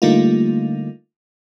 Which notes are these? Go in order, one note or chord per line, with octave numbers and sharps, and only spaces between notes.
D3 G3 A3 A#3 D#4 F4